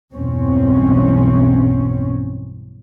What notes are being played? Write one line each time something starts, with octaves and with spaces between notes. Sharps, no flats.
B1 E2 G2 C4 C#4